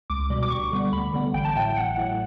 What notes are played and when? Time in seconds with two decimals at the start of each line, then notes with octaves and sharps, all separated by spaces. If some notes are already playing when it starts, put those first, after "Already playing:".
0.10 C#2 D6
0.30 B2 G3
0.43 D6
0.50 D2 C#6
0.71 D3 G3 B3
0.93 D2 B5
1.13 D3 G3 B3
1.34 A1 G5
1.45 A5
1.56 A2 F#3 A3 G5
1.76 A1 F#5
1.97 A2 F#3 A3